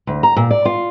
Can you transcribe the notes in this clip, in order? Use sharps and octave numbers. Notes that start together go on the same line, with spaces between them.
D2
A#5
A#2
D5
F4